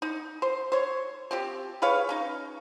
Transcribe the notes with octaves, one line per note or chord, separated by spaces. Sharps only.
D#4
C5
C5 C#5
C4 F4 G4
G#4 B4 C#5 F5
C#4 D#4